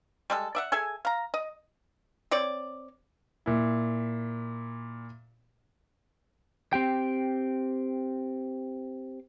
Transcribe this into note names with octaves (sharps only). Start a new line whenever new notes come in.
G3 G#3 A4
D5 E5 F#5
G#4 A4 E5 G#5
F5 A#5
D#5
C4 C#5 D5
A#2 E4
C4 G4 G5